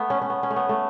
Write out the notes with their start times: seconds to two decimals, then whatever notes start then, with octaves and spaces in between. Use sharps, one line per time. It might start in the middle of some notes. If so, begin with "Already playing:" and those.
Already playing: A3 B3
0.10 C#4
0.22 C#4
0.30 B3
0.43 C#4
0.50 A3
0.56 B3
0.69 A3